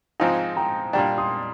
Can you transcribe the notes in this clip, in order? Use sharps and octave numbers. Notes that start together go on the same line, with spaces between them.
G#2 F3 C4 D#4 F5 G#5
G5 A#5
A#2 G3 D4 G5 A#5
C6 D#6